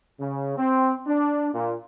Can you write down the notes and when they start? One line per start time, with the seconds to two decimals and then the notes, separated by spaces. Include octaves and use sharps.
0.20 C#3
0.57 C4
1.07 D4
1.54 A#2